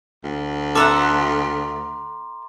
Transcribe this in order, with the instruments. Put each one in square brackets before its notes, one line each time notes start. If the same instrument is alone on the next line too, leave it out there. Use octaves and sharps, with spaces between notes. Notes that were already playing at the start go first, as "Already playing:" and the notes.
[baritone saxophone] D2
[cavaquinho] A4 E5 F#5 [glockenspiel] A#5 C6 D6